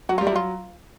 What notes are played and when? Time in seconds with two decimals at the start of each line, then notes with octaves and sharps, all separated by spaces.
0.09 F#3 F#4
0.18 G3 F4
0.27 E4
0.32 F#3 F4